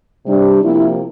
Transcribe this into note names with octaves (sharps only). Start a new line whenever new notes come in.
C3 G3 D4
C3 F3 A#3 E4